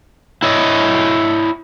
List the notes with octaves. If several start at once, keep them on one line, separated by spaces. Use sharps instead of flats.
E4 C#5 D#5